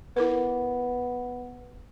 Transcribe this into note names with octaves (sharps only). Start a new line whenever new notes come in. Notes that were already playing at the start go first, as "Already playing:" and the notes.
B3 E4 A#4 B4